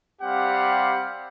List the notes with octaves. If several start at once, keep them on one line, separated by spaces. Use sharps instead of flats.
G3 C4 G4 F5 F#5